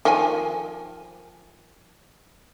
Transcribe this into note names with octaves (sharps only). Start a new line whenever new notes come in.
D#3 F3 G#5